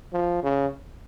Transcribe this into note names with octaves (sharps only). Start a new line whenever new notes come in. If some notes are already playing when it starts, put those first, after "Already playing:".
F3
C#3